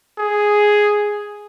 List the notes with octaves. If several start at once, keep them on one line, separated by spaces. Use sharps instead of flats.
G#4